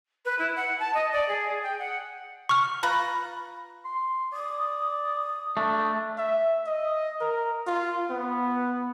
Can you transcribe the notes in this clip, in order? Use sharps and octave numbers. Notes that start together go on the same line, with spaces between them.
B4
E4
F#5
A5
D#5
D5
G#4
G5
F#5
C#6 F6
F4 B4 A#5
C6
D5 D#6
A3 D4
E5
D#5
A#4
F4
B3